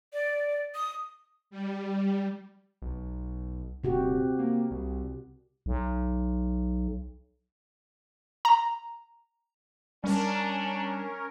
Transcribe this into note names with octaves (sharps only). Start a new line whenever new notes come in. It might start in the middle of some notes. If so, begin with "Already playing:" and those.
D5
D#6
G3
B1
D#1 C3 F#4 G4
A#3
C2
B1
A#5
G3 C#4 D4 A#4